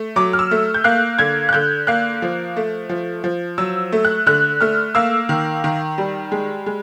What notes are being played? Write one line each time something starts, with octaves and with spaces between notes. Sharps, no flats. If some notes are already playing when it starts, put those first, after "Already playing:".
Already playing: A3
F#3 D6
F6
E6
A3
G6
A#3 F#6
D3 G#6
F#6
D3 G6
A#3 F#6
F3
A3
F3
F3
F#3 E6
A3
F#6
D3 F#6
A3 F6
A#3 E6
D#3
D#3
G3
G#3
G#3